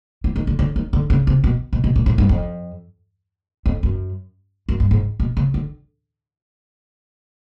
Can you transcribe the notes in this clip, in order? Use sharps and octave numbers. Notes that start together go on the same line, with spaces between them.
E3
D#3
D3
D3
D#3
D3
C#3
C3
B2
B2
B2
A#2
A2
G2
F2
F2
F#2
F#2
G2
G#2
B2
C#3
D3